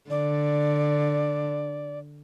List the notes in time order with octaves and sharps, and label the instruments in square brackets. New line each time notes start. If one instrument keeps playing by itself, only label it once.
[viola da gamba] D3 [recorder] D5